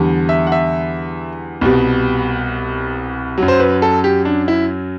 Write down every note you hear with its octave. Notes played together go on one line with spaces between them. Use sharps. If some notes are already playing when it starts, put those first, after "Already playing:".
Already playing: E2 D3 G3
E5
F#5
E5
C2 B2 G3
F#2 F#3
C5
B4
A4
G4
D4
E4